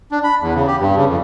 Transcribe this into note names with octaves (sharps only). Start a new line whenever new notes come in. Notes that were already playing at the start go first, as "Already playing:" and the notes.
D4
B5
E2
C#3
G4
G2
C#3
F2